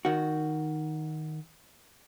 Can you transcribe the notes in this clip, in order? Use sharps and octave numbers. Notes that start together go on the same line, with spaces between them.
D#3 F#4